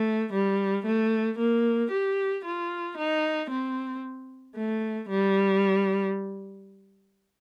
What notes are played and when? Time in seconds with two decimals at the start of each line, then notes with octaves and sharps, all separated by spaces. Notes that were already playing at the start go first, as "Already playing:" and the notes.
Already playing: A3
0.33 G3
0.86 A3
1.39 A#3
1.91 G4
2.44 F4
2.97 D#4
3.50 C4
4.56 A3
5.09 G3